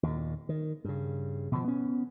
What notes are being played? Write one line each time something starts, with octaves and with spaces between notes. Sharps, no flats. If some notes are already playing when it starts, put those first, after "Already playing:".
D#2 A#2
D#3
G2 C#3
B2 D3 F3
B3 C#4